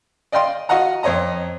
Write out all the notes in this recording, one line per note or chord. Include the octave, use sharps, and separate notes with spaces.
D5 D#5 F5 G5 C6
F#4 D#5 F5 F#5 A#5
F2 C5 C#5 D#5 A#5